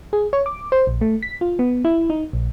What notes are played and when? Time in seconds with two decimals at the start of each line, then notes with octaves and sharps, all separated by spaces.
0.13 G#4
0.33 C#5
0.46 D6
0.72 C5
0.87 A#1
1.01 A3
1.23 B6
1.41 F4
1.59 B3
1.85 E4
2.10 D#4
2.33 A#1